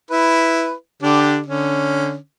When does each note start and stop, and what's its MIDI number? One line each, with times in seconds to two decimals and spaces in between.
0.11 0.73 64
0.11 0.73 71
1.02 1.40 50
1.02 1.40 62
1.02 1.40 67
1.46 2.16 50
1.46 2.16 61